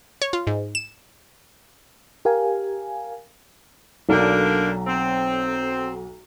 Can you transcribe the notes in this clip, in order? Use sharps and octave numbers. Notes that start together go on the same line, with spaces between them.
C#5
F4
G#2
E7
G4 A#4 F5 G#5
B1 D3 F#3 A#3 D4 A4
C4